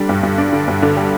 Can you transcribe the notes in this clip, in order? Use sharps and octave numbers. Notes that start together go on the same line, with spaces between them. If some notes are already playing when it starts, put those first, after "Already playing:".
Already playing: D3 G3 D4
G2
G2
D4
D3
G2
D3
G3